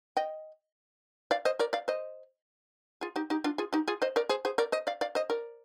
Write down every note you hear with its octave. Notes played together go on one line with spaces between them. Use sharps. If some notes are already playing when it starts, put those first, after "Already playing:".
D#5 G5
D5 F5
C5 D#5
A#4 D5
D5 F5
C5 D#5
F4 G#4
D#4 G4
D#4 G4
D4 F4
F4 G#4
D#4 G4
F4 G#4
C5 D#5
A#4 D5
G#4 C5
G#4 C5
A#4 D5
C5 D#5
D5 F5
D5 F5
C5 D#5
A#4 D5